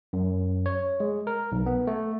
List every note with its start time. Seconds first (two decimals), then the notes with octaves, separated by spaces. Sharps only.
0.13 F#2
0.66 C#5
1.00 G#3
1.27 A#4
1.52 B1
1.66 B3
1.87 A3